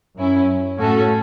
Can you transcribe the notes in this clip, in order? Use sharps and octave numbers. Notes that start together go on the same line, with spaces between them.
F#2 F#3 C#4 E4
A2 A3 C#4 F#4 A4